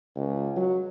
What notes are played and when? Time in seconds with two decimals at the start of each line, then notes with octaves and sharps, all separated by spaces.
0.15 C#2
0.56 F#3